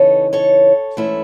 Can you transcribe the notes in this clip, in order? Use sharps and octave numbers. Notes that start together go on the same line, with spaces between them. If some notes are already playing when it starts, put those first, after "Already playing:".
Already playing: C#3 E3 B3 D#4 A4 C#5
A4 C#5
G#2 E3 A3 C#4 E4